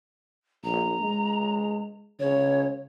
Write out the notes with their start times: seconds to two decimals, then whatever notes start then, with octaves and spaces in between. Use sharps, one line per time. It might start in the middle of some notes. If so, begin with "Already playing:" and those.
0.64 A#1 A#5
1.00 G#3
2.19 C#3 C#5